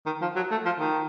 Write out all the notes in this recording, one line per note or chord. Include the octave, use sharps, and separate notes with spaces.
D#3
F3
F#3
A3
F3
D#3